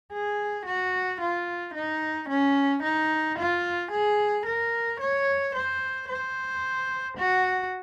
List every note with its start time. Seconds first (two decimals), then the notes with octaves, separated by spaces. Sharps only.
0.12 G#4
0.66 F#4
1.21 F4
1.75 D#4
2.29 C#4
2.83 D#4
3.38 F4
3.91 G#4
4.46 A#4
5.00 C#5
5.56 C5
6.09 C5
7.18 F#4